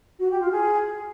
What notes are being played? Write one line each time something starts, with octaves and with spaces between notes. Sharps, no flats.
F#4
G4
F4
G#4